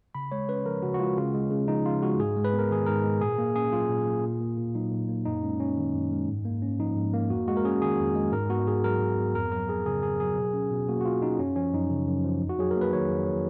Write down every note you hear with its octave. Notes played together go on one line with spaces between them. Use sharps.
C#3 B5
G#3 C#5
C#4 B4
F3 A#4
C#3 F#4
F#4
G#3 F4
C#3 F4
G#3
C#3
F3 D#4
C#3 F4
G#3 F#4
G#2 G#4
G#3
B4
B3
A#4
D#3 G#4
G#2 A#4
G#3
A#2 G#4
A#3
C#4 G#4
F#3 F4
A#2
A#3
A#2
A#3
A#2
F#3 D#4
A#2
A#3
F#2 D#4
G#3 C#4
C#4
D#3
F#2
G#3
G#2
A#3
C#4
F3 D#4
G#2
A#3
F2 F#4
G#3 F#4
A#4
C#4 G#4
D#3 G#4
F2
G#3
G#2 A#4
B3 F#4
G#2 G#4
F#3 A#4
G#2
B3
F2 A#4
F#3 A#4
F2 G#4
C#3 G#4
F2 G#4
F#3 G#4
B2
C#4
B2
A#3 F#4
F#4
B2 F4
C#4 D#4
F#2 C#4
F3 C#4
F#2 D#4
C#3
F#2
F3
F2
F#4
F#3 G#4
A#4
A#3
B4
D#3 C#5
F2
F#3